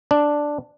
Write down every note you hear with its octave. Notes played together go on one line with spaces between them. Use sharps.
D4